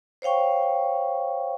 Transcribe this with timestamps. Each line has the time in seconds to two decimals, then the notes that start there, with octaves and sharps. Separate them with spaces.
0.22 C5 C#5 F5 G5 C#6